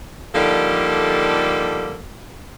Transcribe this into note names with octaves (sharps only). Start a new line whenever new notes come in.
D3 F3 G3 A#3 D#4 A4